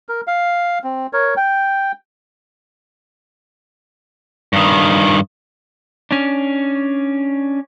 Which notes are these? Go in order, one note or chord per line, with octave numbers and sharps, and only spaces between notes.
A#4
F5
C4
A#4 C#5
G5
G2 D#3
C#4 D4